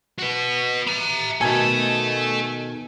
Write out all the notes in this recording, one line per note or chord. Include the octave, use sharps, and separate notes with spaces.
F#4 B4
E5 A#5
B2 D#3 A4 E5 G#5 A5 G#6